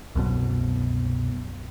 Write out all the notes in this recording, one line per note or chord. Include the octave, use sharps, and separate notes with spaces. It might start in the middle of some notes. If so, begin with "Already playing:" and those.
C2 F#2 B2